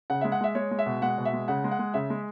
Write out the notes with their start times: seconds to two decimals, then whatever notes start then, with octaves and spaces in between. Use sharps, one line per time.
0.10 C#3 F#5
0.21 G#3 E5
0.32 F#5
0.41 G#3 E5
0.55 G#3 C#5
0.71 G#3
0.79 E5
0.86 B2
1.02 G#3 F#5
1.18 B2
1.25 E5
1.33 G#3
1.48 C#3 F#5
1.64 G#3
1.71 F#5
1.79 G#3
1.94 C#3 E5
2.10 G#3